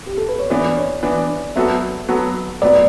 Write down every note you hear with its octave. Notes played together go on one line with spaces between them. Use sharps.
G4
A4
B4
C#5
E3 B3 D4 D5
C#5
E3 B3 D4
F#3 B3 F#4 A4 E5
F#3 B3 F#4 A4
A2 F#3 B3 D5